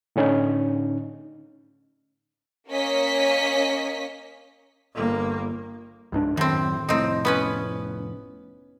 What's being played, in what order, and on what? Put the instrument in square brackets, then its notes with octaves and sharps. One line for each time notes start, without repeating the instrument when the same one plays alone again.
[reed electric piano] A2 D3 C#4 D#4
[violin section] A#3 C#4 D#5 B6
[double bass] G1 A#3
[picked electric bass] C#2 G#2 D4
[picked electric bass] F#2 D#3 [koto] A2 C4
[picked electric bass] F1 A2 [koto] C4 D#4
[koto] B3 C#4 B4